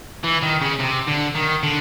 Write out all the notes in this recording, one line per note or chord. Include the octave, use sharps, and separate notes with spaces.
E3
D#3
C#3
C3
D3
D#3
D3